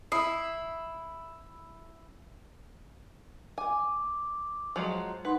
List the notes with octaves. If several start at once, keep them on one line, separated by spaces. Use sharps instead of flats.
E4 D#6 C7
G#5 D6
F3 F#3 G#3
D#4 B4 F#5 C6